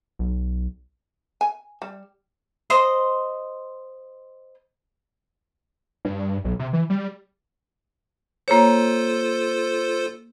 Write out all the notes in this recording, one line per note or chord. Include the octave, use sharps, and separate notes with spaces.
B1
G#5
G3
C5 D#5 C6
G2
B1
C3
E3
G3
A#3 F4 A4 C5 C#5